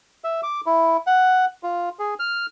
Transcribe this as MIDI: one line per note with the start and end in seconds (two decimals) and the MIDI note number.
0.24 0.41 76
0.43 0.61 86
0.66 0.97 64
1.07 1.45 78
1.63 1.89 65
1.99 2.14 68
2.20 2.46 89